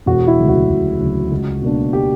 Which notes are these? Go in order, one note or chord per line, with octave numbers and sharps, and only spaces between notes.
E1 F#4
E4
D2 C#3 F#3
F#4
E1
D2 C#3 F#3
C#2
B2 A#3 D4
G4